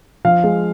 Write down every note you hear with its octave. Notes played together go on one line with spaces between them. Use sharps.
F3 F5
G#3